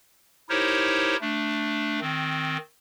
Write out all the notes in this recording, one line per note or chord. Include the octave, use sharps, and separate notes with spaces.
D#4 E4 G4 A#4 C5 C#5
A3 D4
D#3 C4